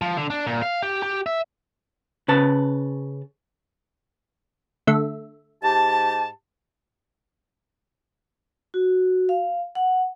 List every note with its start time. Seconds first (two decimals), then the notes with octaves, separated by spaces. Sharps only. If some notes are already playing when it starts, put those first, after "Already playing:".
0.01 F3
0.17 D3
0.30 D4
0.46 A#2
0.62 F5
0.82 G4
1.02 G4
1.26 E5
2.28 C#3 B4 A5
4.87 D3 A3 E5
5.63 G#2 G4 A5
8.74 F#4
9.29 F5
9.75 F#5